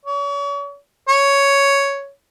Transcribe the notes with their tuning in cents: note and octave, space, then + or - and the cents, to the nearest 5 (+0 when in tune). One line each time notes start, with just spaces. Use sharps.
C#5 +40
C#5 +5